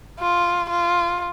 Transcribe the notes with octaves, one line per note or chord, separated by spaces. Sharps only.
F4
F4